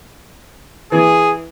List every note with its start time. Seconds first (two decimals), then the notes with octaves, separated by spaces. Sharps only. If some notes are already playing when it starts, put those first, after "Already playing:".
0.92 E3 G#4